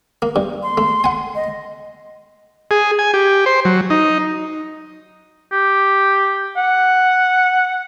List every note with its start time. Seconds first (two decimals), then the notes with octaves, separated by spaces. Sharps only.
0.22 A#3
0.36 G2
0.63 C6
0.78 A3
1.04 F#5 G#5
1.35 D#5
2.71 G#4
2.99 G#5
3.14 G4
3.46 C5
3.65 F#3
3.90 D#4
5.52 G4
6.57 F#5